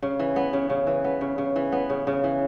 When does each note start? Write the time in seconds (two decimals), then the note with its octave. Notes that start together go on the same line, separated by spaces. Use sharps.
0.02 C#3
0.19 E3
0.36 B3
0.53 C#3
0.70 C#3
0.87 E3
1.04 B3
1.21 C#3
1.38 C#3
1.56 E3
1.72 B3
1.90 C#3
2.07 C#3
2.24 E3